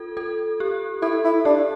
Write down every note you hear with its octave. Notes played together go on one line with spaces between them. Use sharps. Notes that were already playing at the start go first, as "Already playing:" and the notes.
Already playing: F4 A4
A4
G4
E4 A4
E4
D4 G4